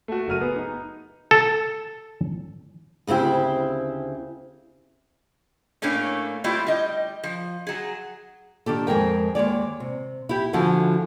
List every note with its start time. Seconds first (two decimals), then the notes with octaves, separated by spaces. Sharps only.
0.08 A3 F#4
0.28 F#1 F#3 F6 D#7
0.41 B3 G#4
0.56 D#4
1.31 A4
3.07 D2 C#3 C4 E4 G4
5.82 A2 A3 A#3 C#4 D4
6.44 G3 A3 C4 E4 F4
6.67 G3 D#5
7.24 F3
7.67 F#3 G#4
8.66 D#3 D4 G4 A4
8.87 F2 G#3 G#4 A#4 G5
9.35 D#2 G#3 C#5 D5
9.80 C3
10.29 E4 G4
10.53 D3 F3 E4 F#4 G#4 A4